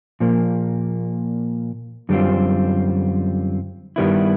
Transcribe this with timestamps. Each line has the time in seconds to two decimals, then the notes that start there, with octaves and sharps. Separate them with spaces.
0.20 A#2 F3 A#3
2.09 F#2 D3 G3 C4 F4
3.96 G2 D#3 G3 B3 E4